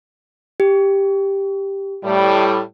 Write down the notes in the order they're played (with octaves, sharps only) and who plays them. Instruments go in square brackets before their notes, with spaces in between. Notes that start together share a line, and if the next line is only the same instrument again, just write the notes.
[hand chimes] G4
[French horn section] A2 G3